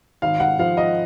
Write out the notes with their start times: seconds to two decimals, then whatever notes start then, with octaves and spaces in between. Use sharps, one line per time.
0.22 G#1 F5
0.40 F#5
0.59 F3 F5
0.77 D#5